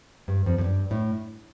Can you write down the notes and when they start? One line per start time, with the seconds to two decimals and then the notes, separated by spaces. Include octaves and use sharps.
0.28 G2
0.46 F2
0.58 F2
0.64 G2
0.91 A2